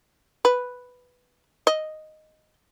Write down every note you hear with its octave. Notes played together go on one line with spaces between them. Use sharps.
B4
D#5